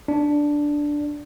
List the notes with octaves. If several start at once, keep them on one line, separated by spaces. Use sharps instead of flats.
D4